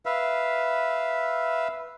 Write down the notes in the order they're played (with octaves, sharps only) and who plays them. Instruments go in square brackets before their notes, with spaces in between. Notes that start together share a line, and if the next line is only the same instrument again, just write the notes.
[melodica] B4 E5 F5